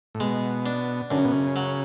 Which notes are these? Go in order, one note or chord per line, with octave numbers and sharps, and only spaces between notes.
A2
B2 G#3
D4
F#2 D3
C#3
B2
C#3
F#3